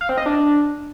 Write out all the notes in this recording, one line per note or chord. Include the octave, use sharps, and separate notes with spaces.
F5
C4
D#5
D4